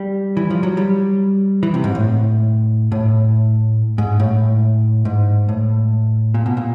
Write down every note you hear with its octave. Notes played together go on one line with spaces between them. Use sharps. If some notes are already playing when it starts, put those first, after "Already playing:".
Already playing: G3
E3
F3
F#3
G3
E3
C3
G#2
A2
A2
G#2
A2
G#2
A2
A#2
B2
A#2